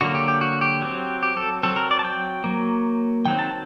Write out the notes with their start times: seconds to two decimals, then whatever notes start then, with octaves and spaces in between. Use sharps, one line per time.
0.01 D3 F#3 A#3 F#4
0.15 G4
0.28 G4
0.41 F#4
0.61 G4
0.82 F#3 C4
1.23 G4
1.37 A4
1.63 F#3 C4 A4
1.76 A#4
1.91 D5
1.99 A5
2.04 G5
2.44 F#3 A#3
3.26 D#3 F#3 C4 G5
3.39 A5